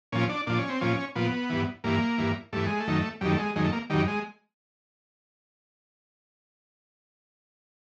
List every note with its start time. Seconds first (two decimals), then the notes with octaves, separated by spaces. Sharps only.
0.12 A#2 F3 C#4
0.29 D4
0.47 A#2 F3 D4
0.58 C#4
0.69 C4
0.81 A#2 F3 C#4
1.15 A#2 F3 B3
1.50 G2 E3
1.84 G2 E3 A#3
2.18 G2 E3
2.53 G2 E3 A3
2.66 G#3
2.80 A3
2.87 F#2 D#3
3.21 F#2 D#3 G3
3.31 A3
3.39 G#3
3.56 F#2 D#3 G#3
3.64 A3
3.73 A#3
3.90 F#2 D#3 G3
4.07 G#3